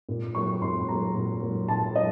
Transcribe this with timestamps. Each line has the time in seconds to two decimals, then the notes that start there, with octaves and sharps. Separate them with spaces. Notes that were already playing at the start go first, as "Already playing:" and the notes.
0.09 A#2
0.35 F#3 A#3 C#6
0.62 A#2 C6
0.89 F#3 A#3 A#5
1.15 A#2
1.42 F#3 A#3
1.68 A#2 A5
1.96 F#3 D#5